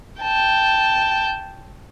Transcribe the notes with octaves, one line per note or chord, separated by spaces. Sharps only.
G5 A5